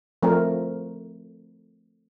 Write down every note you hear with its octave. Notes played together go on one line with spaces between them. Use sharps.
F3 A3 C4 A#4